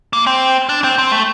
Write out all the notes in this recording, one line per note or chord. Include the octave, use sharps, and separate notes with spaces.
A#3
C4
D4
C4
C4
A3